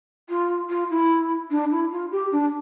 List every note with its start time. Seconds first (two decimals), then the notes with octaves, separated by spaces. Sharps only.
0.29 F4
0.69 F4
0.90 E4
1.50 D4
1.71 E4
1.91 F4
2.11 G4
2.32 D4